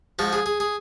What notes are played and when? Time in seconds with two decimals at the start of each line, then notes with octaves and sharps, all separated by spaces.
0.19 G#2 F3 F#4
0.33 G#4
0.46 G#4
0.60 G#4